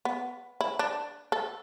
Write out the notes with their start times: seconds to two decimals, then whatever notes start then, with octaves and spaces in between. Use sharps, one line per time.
0.05 B3
0.61 E4
0.79 D4
1.32 A4